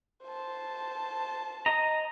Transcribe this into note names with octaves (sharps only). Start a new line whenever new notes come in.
C5 A5
D#5 A#5